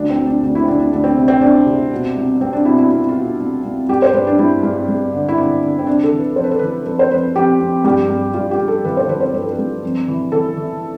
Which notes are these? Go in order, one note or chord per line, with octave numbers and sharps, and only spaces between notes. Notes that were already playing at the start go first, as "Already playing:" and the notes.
Already playing: D2 D4
C4
D2
D4
D2 D4
E4
C4
D2 D4
D4
D2 D4
C4
C3
C4
C3 D4
C3
B2
C2
C2 C4
D4
B2 E4
E4
C2 F4
E4
F4
B2
C2
C2
G2 G4
C5
G2 B4
D4
G2 E4
G2
G2
D3
E4
D3 D4
D3
C4
C3 D4
A4
E3
B4
F2 C5
B4
A4
E3 B4
F2 B4
C5
F2 B4
F2 G4
F2
G2 G4
G2
G2 F4
G4
G2
A4
E3 B4
C5
E3 B4
C5
G2 B4
A4
B4
G2
F2
E3
E3 A4
E3